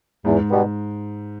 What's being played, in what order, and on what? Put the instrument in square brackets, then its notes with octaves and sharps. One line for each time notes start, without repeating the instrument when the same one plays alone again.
[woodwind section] E2 [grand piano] G#2
[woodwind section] B2 G3 B3